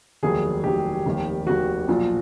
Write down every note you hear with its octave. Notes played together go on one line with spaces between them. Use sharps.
F1 D#2 D#3 F#3 G#4
F1 D#2 D#3 F#3 G4
F1 D#2 D#3
F1 D#2 D#3 F#4
B1 A#2 F3